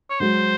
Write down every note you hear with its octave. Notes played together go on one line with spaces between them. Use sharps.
C#5
F#3 G#3 C5